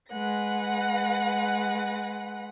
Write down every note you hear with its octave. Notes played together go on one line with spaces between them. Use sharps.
G#3 B4 F#5 A#6